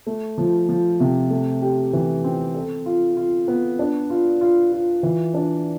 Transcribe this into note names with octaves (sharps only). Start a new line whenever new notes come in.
A3
F3
F3
C3
A3
G4
E3
C4
A4
F4
F4
B3
D4
F4
F4
F4
E3
D4